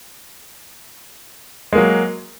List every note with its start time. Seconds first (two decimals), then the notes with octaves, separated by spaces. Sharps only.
1.73 G#3
1.75 A#3
1.78 F#3